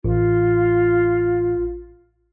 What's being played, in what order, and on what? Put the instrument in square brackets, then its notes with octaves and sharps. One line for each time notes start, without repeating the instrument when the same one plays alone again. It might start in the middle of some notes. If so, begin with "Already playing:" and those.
[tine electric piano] A1 [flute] F4